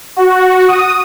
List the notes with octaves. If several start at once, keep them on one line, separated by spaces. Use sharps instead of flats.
F#4
D#6